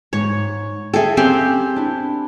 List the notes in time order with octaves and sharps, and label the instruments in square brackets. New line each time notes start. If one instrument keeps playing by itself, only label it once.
[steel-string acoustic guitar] G#2 [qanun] C#5
[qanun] G#4 A4 [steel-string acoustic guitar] E5 F5 G5
[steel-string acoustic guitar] A#3 C#4 [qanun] C4 G4 C6
[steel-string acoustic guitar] D4 E4